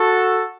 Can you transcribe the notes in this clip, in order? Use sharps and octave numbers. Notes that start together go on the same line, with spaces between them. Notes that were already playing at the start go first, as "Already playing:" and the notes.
Already playing: F#4 A4